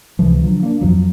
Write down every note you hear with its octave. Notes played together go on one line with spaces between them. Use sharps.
C#2 C3 E3 F3
D3 F3 F#3
A#3 D4
F2 F3 F#3